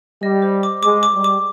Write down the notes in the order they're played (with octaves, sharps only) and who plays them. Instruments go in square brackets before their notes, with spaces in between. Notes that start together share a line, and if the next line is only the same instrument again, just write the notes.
[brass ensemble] G3 [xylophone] D#5
[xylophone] C5
D6
[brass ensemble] G#3 [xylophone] D6
[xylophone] D6
[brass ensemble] G3
[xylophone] D6